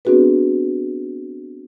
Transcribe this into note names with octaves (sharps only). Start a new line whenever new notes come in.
B3 C4 D4 F#4 G#4 B4